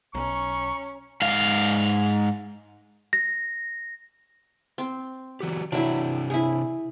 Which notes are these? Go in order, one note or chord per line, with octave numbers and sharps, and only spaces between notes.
B1 C#4 A#5 C#6
G#2 F5
A#6
C4
E3 F#4 G4
C3 F#3 D4 E4 G5
E4 G#4